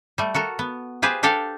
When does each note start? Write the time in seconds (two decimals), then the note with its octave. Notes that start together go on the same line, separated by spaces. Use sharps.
0.18 G3 A3
0.34 F#4 A4 A#4
0.59 B3
1.02 F4 G4 G#4 B4 C5
1.23 D4 G4 A4 F5 G5